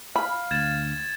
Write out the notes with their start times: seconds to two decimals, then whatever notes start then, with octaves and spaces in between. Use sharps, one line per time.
0.16 F5 B5
0.51 D2 G#6 A6 E7